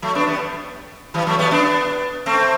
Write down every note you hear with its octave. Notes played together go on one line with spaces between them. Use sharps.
F#3 A3
B3 D4
G3 B3
E3 G3
F#3 A3
G3 B3
B3 D4
A3 C4